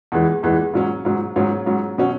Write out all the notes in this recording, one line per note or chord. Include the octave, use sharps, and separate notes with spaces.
E2 E3 G#3
E2 E3 G#3
G#2 F#3 C#4
G#2 F#3 C#4
G#2 F#3 C#4
G#2 F#3 C#4
B2 F#3 C#4